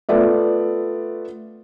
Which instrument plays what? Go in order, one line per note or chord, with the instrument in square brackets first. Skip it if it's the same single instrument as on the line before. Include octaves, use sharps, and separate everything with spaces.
[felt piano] A3 B3 F4 D5 E5